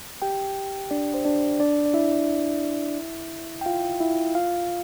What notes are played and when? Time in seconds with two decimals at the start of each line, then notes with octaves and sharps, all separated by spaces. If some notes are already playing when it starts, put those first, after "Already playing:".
0.22 G4 G5
0.91 D4 D5
1.14 C5
1.25 D4 D5
1.60 D4 D5
1.86 D5
1.94 E4 E5
3.61 G5
3.66 F4 F5
4.00 E4 E5
4.35 F4 F5